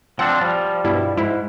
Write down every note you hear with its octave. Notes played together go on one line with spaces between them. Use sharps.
F3 C4 D4 F#5
F3 G3
G2 B2 E4
G#2 E4